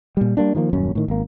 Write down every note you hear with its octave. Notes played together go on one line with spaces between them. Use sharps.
A#2 G3
G3 A#3 D4
D#3 F3 G#3 A#3
D#1 F#2 C#4
A2 D#3
G#1 A#3